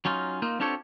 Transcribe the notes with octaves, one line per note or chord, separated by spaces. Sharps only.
F#3 C#4 D#4 F4
A#3 D#4 F4
C4 D4 F4 G4 A4 C#5